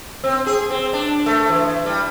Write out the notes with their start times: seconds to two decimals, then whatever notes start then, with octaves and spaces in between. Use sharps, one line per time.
0.24 C4
0.46 G#4
0.70 C4
0.93 D4
1.26 A3
1.49 E3
1.86 G3